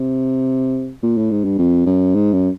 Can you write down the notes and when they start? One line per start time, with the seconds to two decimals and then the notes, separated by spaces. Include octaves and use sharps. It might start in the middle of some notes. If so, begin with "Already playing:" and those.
Already playing: C3
1.03 A#2
1.18 A2
1.31 G#2
1.44 G2
1.58 F2
1.86 F#2
2.15 G#2
2.33 F#2